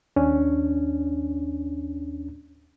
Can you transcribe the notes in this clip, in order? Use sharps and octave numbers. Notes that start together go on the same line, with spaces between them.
D#2 C#4 D4